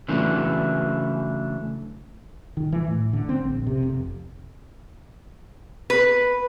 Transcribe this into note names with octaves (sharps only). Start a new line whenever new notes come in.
C#3 E3 F#3 A3 D4
D#3
E3
A2
D3
C4
A#1
C3
F1
B4